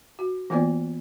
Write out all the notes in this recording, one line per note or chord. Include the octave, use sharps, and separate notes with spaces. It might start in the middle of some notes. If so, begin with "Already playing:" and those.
F#4
E3 A#3 B3 F4 C5 D5